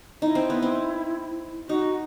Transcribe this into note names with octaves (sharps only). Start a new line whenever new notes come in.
D#4 E4
C4
B3
C4
D#4 F#4